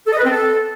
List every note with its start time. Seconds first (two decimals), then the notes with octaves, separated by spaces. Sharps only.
0.07 A4
0.13 D#5
0.19 B4
0.25 C4
0.31 A4